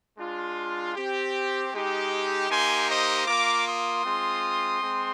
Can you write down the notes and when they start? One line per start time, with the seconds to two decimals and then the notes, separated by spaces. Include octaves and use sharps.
0.17 G#3 D4 F4
0.95 C4 G4
1.72 G#3 D#4 G4
2.50 A#3 D#4 G4 G#5 C6
2.88 C5 D#5
3.27 A#3 F4 A#5 D6
3.66 C6 D#6
4.05 G#3 C4 F4
4.82 G#3 C4